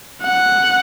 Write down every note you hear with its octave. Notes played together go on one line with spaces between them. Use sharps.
F#5